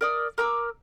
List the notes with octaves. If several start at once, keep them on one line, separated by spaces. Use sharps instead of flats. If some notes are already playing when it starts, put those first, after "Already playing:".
A#4 D5 D#6
A#4 A#5 D6 E6